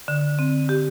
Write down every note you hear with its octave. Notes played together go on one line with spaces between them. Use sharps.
D3
C4
G4